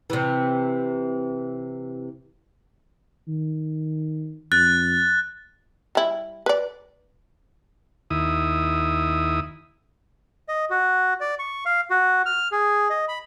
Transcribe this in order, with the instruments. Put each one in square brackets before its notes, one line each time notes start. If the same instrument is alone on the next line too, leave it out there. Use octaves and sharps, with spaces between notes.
[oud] C3 E3
[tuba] D#3
[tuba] F2 [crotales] F#6 A6
[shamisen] G3 E4
B4 D5
[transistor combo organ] D#2 E4 D#6
[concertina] D#5
F#4
D5
C#6
F5
F#4
F6
G#4
D#5
B5